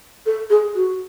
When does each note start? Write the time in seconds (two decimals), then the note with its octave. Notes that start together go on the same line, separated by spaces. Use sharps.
0.26 A4
0.50 G#4
0.75 F#4